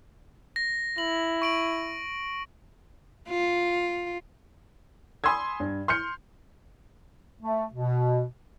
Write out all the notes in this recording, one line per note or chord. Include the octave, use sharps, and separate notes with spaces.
A#6
E4 F#7
C#6 D7 F#7
F4
G#5 B5 C6 D#6 E6 G#6
G2
C6 F6 G6 C#7
A3
B2